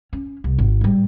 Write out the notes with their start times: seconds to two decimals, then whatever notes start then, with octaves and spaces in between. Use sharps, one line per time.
0.13 C#4
0.44 C2
0.58 G#1
0.81 A1 G3